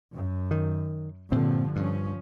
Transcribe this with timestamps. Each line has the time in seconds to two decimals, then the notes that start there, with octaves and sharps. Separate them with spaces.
0.12 F#2
0.51 D#3
1.32 G2 A#2 D3 F3 C4
1.76 G2 F3 C#4